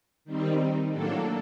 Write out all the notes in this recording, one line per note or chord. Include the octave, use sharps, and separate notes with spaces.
D#3 G3 C4 D#4
A2 F#3 A#3 D4 A4